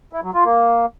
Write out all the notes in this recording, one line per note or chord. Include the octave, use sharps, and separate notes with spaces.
E4
F#3
F4
A#3